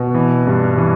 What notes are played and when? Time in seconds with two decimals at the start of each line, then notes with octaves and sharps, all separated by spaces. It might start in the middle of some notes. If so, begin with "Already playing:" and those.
Already playing: B2
0.14 E3
0.47 G2
0.78 E3